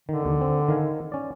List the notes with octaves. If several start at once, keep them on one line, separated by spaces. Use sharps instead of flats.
D3 D#3
D#2
C4
D#3 F5 G#5
C#4 D5